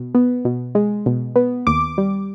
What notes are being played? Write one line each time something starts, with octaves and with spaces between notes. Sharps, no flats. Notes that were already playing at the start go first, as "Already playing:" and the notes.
Already playing: B2
B3
B2
G#3
B2
B3
D#2 D6
G3